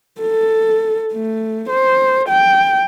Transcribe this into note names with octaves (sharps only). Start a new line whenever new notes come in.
A4
A3
C5
G5